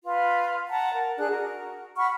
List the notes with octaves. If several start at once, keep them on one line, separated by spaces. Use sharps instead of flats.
F4 B4
F#5 A5 A#5
A#4
D4 G#4 F#6
F#4 A#4
F#5 B5 C#6 F6